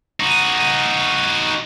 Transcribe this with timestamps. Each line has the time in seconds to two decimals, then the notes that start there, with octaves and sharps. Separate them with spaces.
0.20 D#4 F#4